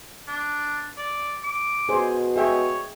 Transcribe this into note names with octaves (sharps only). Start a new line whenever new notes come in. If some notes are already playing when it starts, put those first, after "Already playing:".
D4
D5
D6
B2 G#4 C5
G#4 C#5 E5 G5